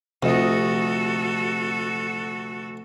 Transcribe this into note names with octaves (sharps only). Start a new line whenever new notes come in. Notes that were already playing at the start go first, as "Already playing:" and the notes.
D2 C3 F3 F#4 A4 D#5